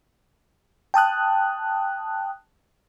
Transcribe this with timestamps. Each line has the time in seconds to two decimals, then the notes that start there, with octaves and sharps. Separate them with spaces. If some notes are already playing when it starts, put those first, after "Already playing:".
0.94 G5 A5 D#6 F#6